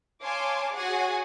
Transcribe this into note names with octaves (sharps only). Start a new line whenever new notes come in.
C#5 F5 G#5 A5 C6 D6
F#4 G#4 C#5 F#5 G#5